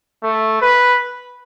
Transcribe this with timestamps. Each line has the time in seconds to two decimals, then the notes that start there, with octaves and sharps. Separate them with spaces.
0.23 A3
0.62 B4